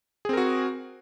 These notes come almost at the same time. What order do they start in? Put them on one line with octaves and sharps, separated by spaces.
G#4 C4 A#4 F#4